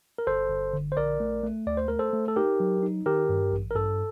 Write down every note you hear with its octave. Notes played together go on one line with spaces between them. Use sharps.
A#4
G1 A4 C5
G1
D3
C5
A#1 A#4 D5
A3
A3
D2 D5
C5
A3 A#4
A4 C5
A3
A4
D#4 G4 A#4
F#3
D#4
D#3 G4 A#4
G2
A1
A#4
G2 A4